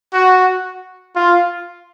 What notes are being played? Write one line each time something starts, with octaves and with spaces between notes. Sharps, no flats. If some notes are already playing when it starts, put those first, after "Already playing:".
F#4
F4